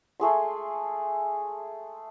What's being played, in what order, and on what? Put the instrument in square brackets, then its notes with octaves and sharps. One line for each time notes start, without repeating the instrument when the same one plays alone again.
[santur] G#3 A3 G#4 C6